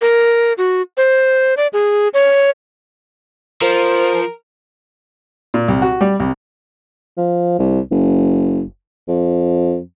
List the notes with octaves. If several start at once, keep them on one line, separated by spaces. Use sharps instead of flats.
A#4
F#4
C5
D5
G#4
C#5
F3 A#4 C5
A#2
C2
F#4
G3
C2
F3
C2
F#1
F2